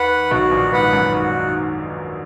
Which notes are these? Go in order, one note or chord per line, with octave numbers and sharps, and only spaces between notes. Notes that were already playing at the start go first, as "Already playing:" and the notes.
Already playing: D#2 B4 F#5
B1 B2 F#4
A#1 A#2
G#2 B4 F#5
F#2
G#2 F#4